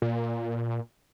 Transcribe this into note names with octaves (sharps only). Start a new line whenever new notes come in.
A#2